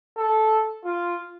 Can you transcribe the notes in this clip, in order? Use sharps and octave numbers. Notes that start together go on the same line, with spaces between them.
A4
F4